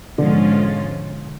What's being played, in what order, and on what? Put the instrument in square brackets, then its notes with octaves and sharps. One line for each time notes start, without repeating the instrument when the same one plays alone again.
[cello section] G#2 F3 G#3 C#4 F4 [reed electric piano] B2 D3